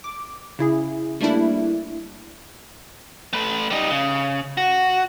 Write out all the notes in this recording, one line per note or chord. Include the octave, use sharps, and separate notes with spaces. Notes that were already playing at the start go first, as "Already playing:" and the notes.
D6
C#3 E4 G#4
G3 A3 A#3 D4 E4
A3 B4
G3 D#4
C#3
F#4